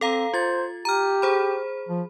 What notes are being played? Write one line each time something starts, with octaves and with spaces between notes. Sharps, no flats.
C4 A4 F5 A#5
F4 C5 A6
G4 A#5 F6
G#4 C5 B5
F3